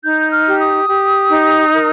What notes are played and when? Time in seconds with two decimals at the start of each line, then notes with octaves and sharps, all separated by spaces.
0.04 D#4 G6
0.32 F6
0.46 G4
0.60 D#6
0.88 G4
1.30 D#4
1.73 A#4